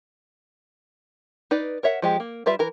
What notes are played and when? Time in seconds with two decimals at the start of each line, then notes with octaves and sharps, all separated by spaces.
1.51 D#4 B4 D5
1.83 A#4 C#5 E5 F#5
2.02 F3 G#3 G4
2.20 A#3
2.46 G3 F4 B4 E5 B5
2.59 E3 A#4